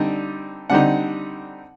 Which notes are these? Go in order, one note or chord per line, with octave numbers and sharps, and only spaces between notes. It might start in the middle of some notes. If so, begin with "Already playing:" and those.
Already playing: D3 G3 C4 D#4
D3 G3 C4 D#4 F#5